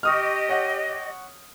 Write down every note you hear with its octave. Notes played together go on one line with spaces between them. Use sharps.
G4 D#5 C#6 D#6 F6
C#5 F#5